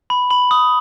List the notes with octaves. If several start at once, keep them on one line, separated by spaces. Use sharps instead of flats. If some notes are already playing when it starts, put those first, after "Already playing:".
B5
B5 F#7
D#6